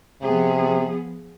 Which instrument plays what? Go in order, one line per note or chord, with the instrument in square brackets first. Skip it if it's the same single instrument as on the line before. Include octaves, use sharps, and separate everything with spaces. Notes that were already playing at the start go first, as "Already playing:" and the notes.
[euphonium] C3 [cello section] F3 B3 G#4